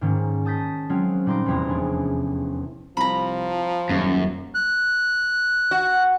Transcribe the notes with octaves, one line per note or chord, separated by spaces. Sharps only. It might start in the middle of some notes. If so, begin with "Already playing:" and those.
G#2 D#3 A#3 C#4
A5 D#6 G6 A6 B6
F#3 G#3 C4 C#4 F4
A#2 G3 D#4 C6 D6 A#6
F1 E2 C3 C4 E4 A#5
C#4 D4 G#4
C2 F3 A#5 B5
D#1 F#2
F#6
F#4